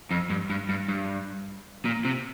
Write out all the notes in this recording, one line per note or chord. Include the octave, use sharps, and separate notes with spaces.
F2
G2
G2
G2
G2
A#2
C3